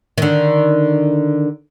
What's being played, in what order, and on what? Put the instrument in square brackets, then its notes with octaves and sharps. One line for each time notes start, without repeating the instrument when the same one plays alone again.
[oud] D3 D#3